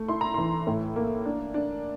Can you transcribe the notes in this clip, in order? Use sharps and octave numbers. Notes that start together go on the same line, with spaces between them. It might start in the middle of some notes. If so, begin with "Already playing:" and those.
Already playing: A3
E4 C6
A#5
E3 C6
A2
A#3
D4
D4